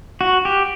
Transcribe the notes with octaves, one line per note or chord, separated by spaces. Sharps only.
F#4
G4